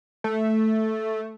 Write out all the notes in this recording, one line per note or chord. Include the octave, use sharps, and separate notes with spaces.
A3